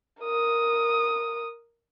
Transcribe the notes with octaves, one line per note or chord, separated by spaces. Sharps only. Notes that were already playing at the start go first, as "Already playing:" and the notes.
A#4 D#6